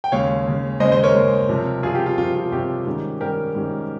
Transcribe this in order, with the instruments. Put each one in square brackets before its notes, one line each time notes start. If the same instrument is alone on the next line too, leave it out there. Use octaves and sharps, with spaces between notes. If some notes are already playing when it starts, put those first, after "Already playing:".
[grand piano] G5
D#2 C#3 G#3 C#5 F5
D#2 C#3 G#3
D#2 C#3 G#3 C5 D#5
C5 D#5
A#4 C#5
D#2 C#3 G#3
C2 C3 F3
C2 C3 F3 F4 G#4
G4
F4
C2 C3 F3 F4
F4
C2 C3 F3 G4
G#2 D#3 G3 C#4
G#2 D#3 G3 C#4 G4 A#4
G#2 D#3 G3 C#4